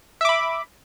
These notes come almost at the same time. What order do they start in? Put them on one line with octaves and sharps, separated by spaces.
E5 D6 B5